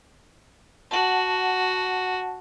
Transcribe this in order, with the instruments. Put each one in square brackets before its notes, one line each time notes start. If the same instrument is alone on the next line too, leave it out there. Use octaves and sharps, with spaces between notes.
[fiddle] F#4 [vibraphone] F#5 A5